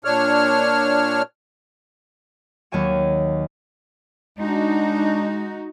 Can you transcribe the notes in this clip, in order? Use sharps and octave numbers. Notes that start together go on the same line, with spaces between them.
A#2 D4 C#5 F6
D#2 F#3 C#5 G#5 E7
G#3 D4 D#4 F#4